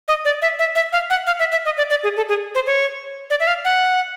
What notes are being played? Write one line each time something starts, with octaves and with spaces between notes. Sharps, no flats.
D#5
D5
E5
E5
E5
F5
F#5
F5
E5
E5
D#5
D5
D5
G#4
A4
G#4
C5
C#5
D5
E5
F5
F#5